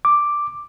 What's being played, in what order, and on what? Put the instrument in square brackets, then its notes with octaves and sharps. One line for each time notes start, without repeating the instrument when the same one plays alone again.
[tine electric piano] D6